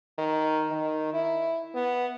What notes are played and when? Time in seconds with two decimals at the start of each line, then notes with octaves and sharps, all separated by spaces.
0.19 D#3
0.71 D#3
1.14 E4
1.75 B3